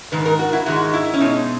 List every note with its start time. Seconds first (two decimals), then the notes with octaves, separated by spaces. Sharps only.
0.12 G#2 D#3 B4
0.25 A#4
0.39 F#4
0.53 E4
0.66 G#2 D#3 G#3 F#4
0.94 E4
1.14 C#4
1.20 B2 G#3 D#4